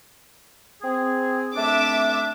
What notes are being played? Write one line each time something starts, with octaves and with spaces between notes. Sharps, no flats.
C4 G#4
A3 C4 D4 E5 D6